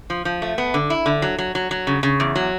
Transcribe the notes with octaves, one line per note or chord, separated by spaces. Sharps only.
F3
F3
A3
B3
D3
E4
D3
F#3
F#3
F#3
F#3
C#3
C#3
E2
F#3